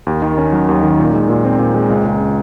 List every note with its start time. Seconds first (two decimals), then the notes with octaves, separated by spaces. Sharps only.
0.07 D#2
0.22 D#3
0.38 C#4
0.52 F#3
0.68 D#2
0.83 D#3
0.99 A#2
1.13 G#3
1.29 A#2
1.45 C4
1.59 A#2
1.75 G#3
1.90 C#2
2.05 C#3